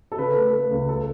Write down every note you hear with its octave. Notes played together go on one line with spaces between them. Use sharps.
A4
C#3 B4
A3
A3
C#2
A4